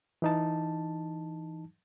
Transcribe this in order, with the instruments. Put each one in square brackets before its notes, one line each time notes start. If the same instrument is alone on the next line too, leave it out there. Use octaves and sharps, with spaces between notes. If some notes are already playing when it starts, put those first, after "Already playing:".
[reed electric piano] E3 D#4 A5